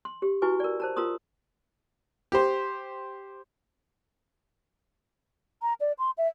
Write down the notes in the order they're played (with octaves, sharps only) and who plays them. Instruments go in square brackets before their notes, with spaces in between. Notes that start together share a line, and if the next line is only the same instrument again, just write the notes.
[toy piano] C6
G4
E4 F#4 B4 G#5 C#6
A#4 D5
C5 A5 A#5
F4 A#4 A#5 C6 D#6
[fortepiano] G4 C5
[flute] A#5
D5
C6
E5